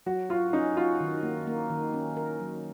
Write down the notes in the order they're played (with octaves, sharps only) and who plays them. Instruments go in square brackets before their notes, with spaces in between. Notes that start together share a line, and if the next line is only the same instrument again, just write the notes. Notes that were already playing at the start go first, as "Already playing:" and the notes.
[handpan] F#3 [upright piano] F#4
[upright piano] F4 [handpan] F#4
[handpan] C#4 [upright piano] D#4
[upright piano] F4 [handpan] F#4
[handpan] D#3
A#3
A#3
D#3
C#4
A#4
F#3